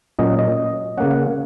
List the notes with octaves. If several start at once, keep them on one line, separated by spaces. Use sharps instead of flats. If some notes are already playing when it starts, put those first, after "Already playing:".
A#2 F#3 C#4 D#5
D#5
C#3 A#3 C#4 F#5
F#5